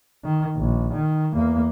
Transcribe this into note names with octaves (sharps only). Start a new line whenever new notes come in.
D#3
A#1
D#3
E2 A#3